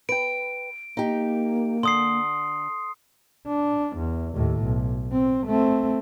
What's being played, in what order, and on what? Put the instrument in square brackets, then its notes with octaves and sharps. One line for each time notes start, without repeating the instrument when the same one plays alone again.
[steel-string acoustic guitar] B4 G5 [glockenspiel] D7
[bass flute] A#3 [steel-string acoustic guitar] D#4 G4
[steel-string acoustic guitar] D3 [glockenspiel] C6 D#6 C7
[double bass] D4
E2
D#2 A2
B1
C4
A3 C4